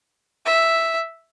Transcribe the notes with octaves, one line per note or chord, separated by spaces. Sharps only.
E5